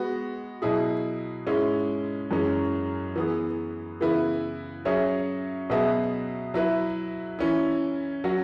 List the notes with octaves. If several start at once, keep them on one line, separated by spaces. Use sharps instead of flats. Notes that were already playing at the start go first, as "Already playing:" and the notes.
Already playing: G#3 B3 F#4
B2 F#3 E4 G#4
G#2 G#3 C#4 E4
F#2 E3 G#3 C#4
E3 B3 G#4
C#3 E3 B3 E4 B4
F#3 C#4 G#4 C#5 E5
B2 F#3 B3 G#4 E5
F#3 E4 B4 E5
E3 C#4 E4
F#3 C#4 F#4